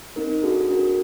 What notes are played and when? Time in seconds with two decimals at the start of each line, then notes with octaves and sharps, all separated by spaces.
0.16 C4 D#4 A#4
0.43 D4 F#4 G#4 A4
0.69 D4 F#4 A#4